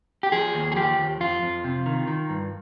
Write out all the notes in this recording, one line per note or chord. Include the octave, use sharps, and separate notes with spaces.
G4
F3 G#4
D#2
G#4
F3 G4
D#2
F2 F4
F2
C3
D#3
D#3
G2